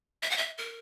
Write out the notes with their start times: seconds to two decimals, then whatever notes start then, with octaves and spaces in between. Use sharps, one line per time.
0.23 E5
0.30 F#5
0.38 E5
0.58 A#4